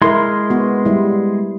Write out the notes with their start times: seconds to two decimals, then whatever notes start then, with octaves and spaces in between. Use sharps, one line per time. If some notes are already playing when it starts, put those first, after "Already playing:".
0.02 G#3 E4 A#4 C6
0.50 B3 F#4
0.85 G3 E4